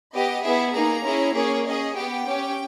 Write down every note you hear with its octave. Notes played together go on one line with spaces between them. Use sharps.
B3 G4 D#5
B3 E4 G#4 E5
A#3 D#4 G#4 A#5
C#4 E4 G#4
A#3 C#4 G#4 C#5
C#4 G#4 D#5
B3 G4 G5
C#4 G4